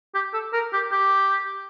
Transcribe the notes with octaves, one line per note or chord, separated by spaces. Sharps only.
G4
A4
A#4
G4
G4